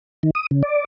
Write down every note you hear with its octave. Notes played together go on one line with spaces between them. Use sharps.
D#3
D#6
C#3
D5